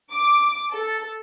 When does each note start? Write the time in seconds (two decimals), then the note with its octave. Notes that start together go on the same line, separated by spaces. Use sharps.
0.13 D6
0.74 A4